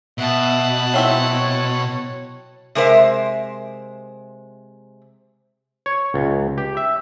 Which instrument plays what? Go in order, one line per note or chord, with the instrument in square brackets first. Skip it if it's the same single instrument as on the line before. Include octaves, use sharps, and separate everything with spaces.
[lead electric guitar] B2 [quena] E5 [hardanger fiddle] F#5 A5
[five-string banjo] F#3 C4 E4 [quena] C#5
[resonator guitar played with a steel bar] C3 G#3 A#4 C5 E5
[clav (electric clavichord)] C#5
C#2
G4
E5